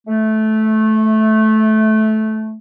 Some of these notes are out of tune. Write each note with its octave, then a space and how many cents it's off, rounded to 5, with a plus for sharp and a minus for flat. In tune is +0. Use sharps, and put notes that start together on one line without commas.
A3 -15